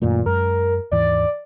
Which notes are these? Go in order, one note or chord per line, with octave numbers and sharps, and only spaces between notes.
F#2 A#2 D#3 A3
F#2 G#3 A#4
D#2 G#2 E3 D5